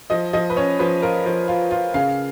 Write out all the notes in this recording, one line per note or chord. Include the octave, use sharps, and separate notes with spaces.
F3 D#5
F3 D#5
B4
C#4 C#5
F3 B4
F4 A#4
F3
F4
F4
C#3 F5